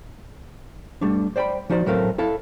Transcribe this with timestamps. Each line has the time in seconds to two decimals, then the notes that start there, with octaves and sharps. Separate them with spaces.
1.01 G3 A3 D4
1.36 C5 D5 G5 G#5 B5
1.70 F3 D#4 F#4 C5 D5
1.86 A2 F#3 A3 C4 A#4 F5
2.18 E4 A4 F5